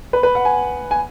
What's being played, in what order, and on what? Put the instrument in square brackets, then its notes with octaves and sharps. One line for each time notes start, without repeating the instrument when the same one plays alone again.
[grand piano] B4
B4
F#5
G#5
G#5